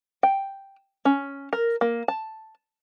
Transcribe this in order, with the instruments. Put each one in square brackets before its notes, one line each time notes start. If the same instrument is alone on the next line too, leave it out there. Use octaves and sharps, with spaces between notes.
[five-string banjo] G5
C#4
A#4
A#3
A5